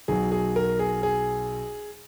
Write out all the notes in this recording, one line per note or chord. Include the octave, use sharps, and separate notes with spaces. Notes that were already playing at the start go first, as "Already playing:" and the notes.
B1 B2 F#3 G#4
G#4
A#4
G#4
G#4